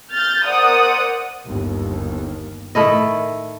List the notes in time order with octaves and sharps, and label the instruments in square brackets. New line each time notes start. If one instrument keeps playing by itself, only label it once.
[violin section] F6 G6 A6
A#4 C5 D5 F#5 D#6
[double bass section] G1 D#2
[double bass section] A2 D#3 [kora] A3 E4 D#5